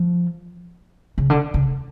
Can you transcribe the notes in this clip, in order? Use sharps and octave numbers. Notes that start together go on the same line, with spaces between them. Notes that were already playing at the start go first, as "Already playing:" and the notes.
Already playing: F3
C#3
D3
C#3